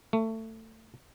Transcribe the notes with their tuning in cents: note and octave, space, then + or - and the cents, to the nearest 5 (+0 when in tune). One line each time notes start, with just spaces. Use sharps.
A3 +20